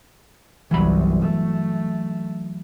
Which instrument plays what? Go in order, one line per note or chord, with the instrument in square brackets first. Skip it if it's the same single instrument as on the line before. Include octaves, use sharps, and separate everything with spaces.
[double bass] G1 C2 [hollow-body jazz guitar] E3 F#3 B5
[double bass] A3